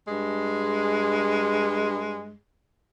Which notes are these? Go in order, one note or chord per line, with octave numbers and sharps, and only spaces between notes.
G2 G#3